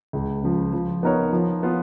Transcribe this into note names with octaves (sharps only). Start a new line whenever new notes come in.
C#2
C#3 F3
F3
B3 D#4 A#4 C#5
F3
B3 F4